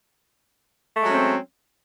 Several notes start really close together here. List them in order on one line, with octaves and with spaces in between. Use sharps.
A3 G#3 F#3 C#4 C4